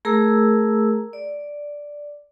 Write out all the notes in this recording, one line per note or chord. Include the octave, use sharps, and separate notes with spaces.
A3 G#4 A#4 A#5 E6
D5